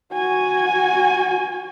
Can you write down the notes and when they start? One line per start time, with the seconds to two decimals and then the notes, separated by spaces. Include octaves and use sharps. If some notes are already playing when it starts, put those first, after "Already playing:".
0.12 F#4 G#5